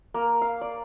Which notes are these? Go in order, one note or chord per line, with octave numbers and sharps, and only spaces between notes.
A#3
F5
D5